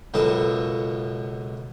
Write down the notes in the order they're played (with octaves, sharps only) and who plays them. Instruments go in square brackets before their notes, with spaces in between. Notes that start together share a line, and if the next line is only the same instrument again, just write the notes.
[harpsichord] C#2 F#2 B2 A4 D#6